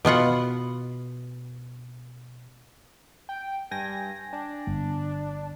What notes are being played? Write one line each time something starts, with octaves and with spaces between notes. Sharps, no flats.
B2 B3 F4 F#5
G5
G2 G5 G#5 A#6
D4
G1